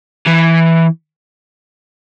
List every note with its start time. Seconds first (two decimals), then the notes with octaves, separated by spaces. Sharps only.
0.27 E3